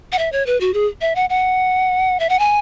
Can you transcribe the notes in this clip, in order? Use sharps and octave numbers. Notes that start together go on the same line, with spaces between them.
F#5
E5
C#5
B4
F#4
G#4
E5
F#5
F#5
E5
F#5
G#5